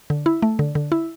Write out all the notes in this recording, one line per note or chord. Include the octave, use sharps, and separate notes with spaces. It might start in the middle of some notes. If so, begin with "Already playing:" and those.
D3
E4
A3
D3
D3
E4